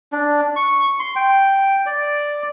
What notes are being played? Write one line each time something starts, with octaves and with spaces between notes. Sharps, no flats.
D4
C#6
C6
G5
D5